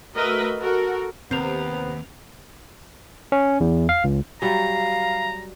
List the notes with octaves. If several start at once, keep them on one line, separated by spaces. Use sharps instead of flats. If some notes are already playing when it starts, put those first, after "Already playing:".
A3 F#4 A#4 B4 D#5 E5
F#4 A4 A#4
D#2 C3 B3 C4 A#4 F7
C#4
E2
F5
C#2
F#3 G3 F5 A#5